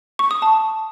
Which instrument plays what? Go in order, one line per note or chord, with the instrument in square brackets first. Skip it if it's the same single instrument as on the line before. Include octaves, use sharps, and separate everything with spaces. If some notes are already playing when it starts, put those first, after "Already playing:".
[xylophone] C#6
D#6
A5